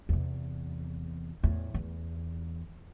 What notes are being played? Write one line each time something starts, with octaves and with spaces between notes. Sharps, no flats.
E2 C3
E2 A2
E2